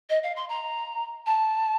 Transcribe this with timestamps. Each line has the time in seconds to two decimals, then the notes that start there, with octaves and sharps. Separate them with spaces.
0.10 D#5
0.23 F5
0.36 C6
0.49 A#5
1.26 A5